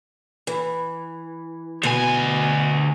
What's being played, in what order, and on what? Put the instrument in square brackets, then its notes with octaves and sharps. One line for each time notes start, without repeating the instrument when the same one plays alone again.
[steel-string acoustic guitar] E3
[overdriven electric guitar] D2 G#5 [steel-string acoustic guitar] B2